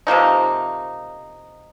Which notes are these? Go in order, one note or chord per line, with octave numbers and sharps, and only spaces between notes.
C3 F3 A#3 D#4